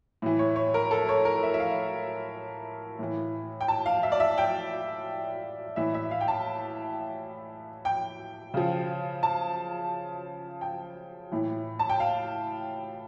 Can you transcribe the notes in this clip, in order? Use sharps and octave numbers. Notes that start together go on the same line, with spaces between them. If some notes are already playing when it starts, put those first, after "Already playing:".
A2 E3
C#5
C#5
A#4
A4
C#5
A#4
E5
E5
F5
A2 E3
G5
A5
F5
E5
D5
E5
G5
A2 E3 E5
E5
F5
G5
A5
G5
C#3 F3
A5
G5
A2 E3
A5
G5
F5